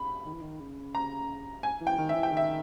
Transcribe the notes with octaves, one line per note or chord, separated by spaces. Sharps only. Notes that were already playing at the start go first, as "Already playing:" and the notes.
Already playing: B5
D#3
E3
D#3
C#3
A#5
G#5
E3
G5
D#3
E5
E3
G5
D#3
E5